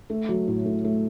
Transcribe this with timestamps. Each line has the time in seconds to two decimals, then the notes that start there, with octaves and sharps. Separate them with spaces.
0.10 A3
0.29 F#3
0.48 A2
0.66 A2
0.85 A3